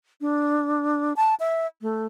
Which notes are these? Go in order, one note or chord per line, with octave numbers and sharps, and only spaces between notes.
D4
A5
E5
A3